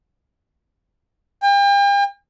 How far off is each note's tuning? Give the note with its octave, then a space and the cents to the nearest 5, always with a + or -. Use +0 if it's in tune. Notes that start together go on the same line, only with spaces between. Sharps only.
G5 +40